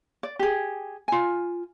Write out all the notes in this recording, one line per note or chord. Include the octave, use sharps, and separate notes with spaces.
D5
G4 G#4
F4 G#5